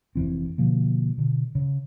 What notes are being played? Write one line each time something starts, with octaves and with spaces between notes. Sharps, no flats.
F1 E3 C4
B2 D3 F3 A#3
B2 D3
C#3